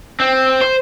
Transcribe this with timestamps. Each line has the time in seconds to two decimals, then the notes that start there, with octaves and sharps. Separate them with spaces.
0.20 C4
0.61 C5